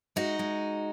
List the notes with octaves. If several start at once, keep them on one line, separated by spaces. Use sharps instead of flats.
G#3 D#4 F#4
G#3